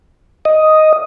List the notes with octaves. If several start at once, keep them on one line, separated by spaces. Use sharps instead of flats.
D#5